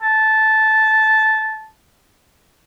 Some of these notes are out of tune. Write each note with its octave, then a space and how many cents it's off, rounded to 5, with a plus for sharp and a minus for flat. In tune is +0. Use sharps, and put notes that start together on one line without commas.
A5 -10